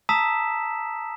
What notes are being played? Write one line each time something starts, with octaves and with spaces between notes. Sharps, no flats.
A5 A#5 D#6 E6 B6 E7